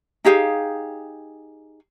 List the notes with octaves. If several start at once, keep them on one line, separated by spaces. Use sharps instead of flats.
D#4 G4 G#4 F5